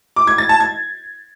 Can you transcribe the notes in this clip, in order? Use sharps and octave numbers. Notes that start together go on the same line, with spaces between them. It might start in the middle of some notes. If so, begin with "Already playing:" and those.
D6
G#6
A6
A5
G#6